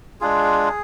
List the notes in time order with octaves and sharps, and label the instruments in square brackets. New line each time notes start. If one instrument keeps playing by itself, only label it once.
[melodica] G#3 D4 F4 G#4